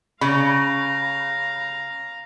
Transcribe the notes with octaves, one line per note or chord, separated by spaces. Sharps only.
C#3 F5 A#5 B5